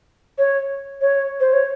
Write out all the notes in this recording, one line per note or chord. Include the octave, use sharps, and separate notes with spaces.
C#5
C#5
C5
C#5